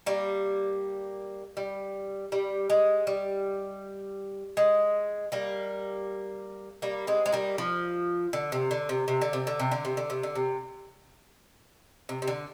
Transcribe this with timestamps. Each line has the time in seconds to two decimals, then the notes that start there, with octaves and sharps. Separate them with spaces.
0.06 G3 A#3
1.57 G3
2.32 G3
2.70 G#3
3.07 G3
4.57 G#3
5.32 G3 A#3
6.82 G3 A#3
7.07 G#3 C4
7.26 G#3
7.32 G3 A#3
7.58 F3
8.33 D3
8.52 C3
8.71 D3
8.89 C3
9.08 C3
9.22 D3
9.33 C3
9.47 D3
9.59 C3
9.71 D3
9.85 C3
9.97 D3
10.10 C3
10.23 D3
10.35 C3
12.09 C3
12.22 C3
12.28 D3